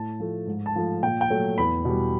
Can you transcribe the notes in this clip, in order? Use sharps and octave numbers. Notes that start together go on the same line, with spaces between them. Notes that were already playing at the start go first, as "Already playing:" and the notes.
Already playing: A2 A5
F3 A3
G#2
A5
F3 A3
A#2 G5
G5
F#3 A3
E2 B5
B2 G3